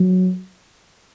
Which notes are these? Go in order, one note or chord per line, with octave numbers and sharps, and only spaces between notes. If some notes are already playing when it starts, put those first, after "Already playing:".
Already playing: F#3